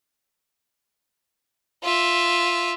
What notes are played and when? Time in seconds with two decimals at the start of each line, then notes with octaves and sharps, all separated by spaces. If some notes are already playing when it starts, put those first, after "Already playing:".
1.84 F4 E5